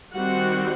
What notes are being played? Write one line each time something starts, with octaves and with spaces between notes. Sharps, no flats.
D#3 G3 C4 F#4 F#5